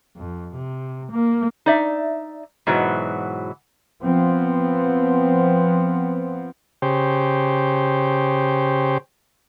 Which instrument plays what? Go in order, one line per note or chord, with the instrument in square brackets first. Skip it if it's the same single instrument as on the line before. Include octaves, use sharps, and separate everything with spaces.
[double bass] F2
C3
A#3
[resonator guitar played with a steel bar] D#4 D5 E5
G#2 B2 E3 F#3
[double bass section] F3 B3 C4
[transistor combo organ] C#3 G4 C5